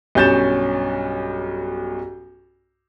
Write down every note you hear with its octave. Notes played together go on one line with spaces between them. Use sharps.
B1 G2 C#4 G6 A6 E7